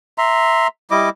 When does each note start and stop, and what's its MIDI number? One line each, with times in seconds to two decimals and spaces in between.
0.18 0.67 76
0.18 0.67 82
0.18 0.67 84
0.91 1.09 55
0.91 1.09 64
0.91 1.09 75
0.91 1.09 86